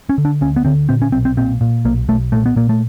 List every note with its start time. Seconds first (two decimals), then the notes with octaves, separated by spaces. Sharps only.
0.09 C#4
0.18 D3
0.25 D4
0.41 D2 C#4
0.56 B3
0.65 D3 C4
0.89 A#2 C4
1.02 C#4
1.12 B1 C4
1.25 C4
1.37 A#2 C4
1.61 A#2
1.85 B1 A#3
2.09 B1 A3
2.32 A#2 A3
2.46 B3
2.56 A#2 A#3
2.69 A3